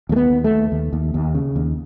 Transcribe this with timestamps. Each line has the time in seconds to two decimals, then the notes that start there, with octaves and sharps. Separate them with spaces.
0.09 D#2 A3
0.16 B3
0.30 D#2
0.44 A3
0.51 D#2
0.72 D#2
0.93 D#2
1.14 D#2
1.35 C#3
1.56 D#2